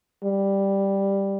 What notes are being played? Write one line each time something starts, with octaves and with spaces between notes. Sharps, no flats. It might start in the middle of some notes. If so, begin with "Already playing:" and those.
G3